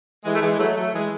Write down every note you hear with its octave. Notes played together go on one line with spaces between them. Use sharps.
E3 G#3
A3
E3 G#3
F#3 A3
F#3 A3
E3 G#3